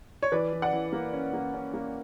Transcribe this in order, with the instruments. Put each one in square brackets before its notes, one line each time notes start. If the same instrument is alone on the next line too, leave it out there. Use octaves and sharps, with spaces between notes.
[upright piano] C#5
E3 B4 D5
E3
D5 F#5
E3
A#3
C#4
A#3
C#4
A#3